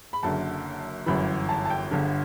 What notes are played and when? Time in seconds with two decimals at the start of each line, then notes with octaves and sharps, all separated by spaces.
0.13 B5
0.23 F#1 F#2 D3 A5
1.06 G1 F#2 E3 B5
1.49 A5
1.65 A5
1.70 G5
1.91 G1 G2 D3